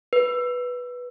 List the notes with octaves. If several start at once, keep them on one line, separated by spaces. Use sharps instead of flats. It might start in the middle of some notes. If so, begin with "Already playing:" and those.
B4